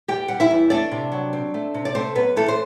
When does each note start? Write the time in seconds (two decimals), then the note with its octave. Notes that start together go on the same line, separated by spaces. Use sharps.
0.08 E2 G4 G5
0.28 G3 F#5
0.40 E4 E5
0.51 E2
0.70 A3 D4 D5
0.92 C3
1.12 F#3
1.33 C4
1.54 A3
1.74 C3
1.85 D5
1.94 A3 C4 C5
2.15 F#2 B3 B4
2.36 E3 A3 A4
2.48 C5